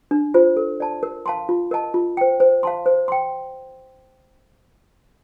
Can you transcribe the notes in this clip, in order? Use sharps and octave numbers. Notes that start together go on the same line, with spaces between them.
D4
F4 C5
A4
D5 A5
A#4
F5 A5 C6
F4
A#4 D#5 A5
F4
C5 G5
C5
F5 A5 C6
C5
G5 C6